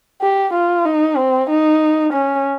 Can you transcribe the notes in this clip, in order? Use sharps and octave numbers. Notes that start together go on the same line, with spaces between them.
G4
F4
D#4
C4
D#4
C#4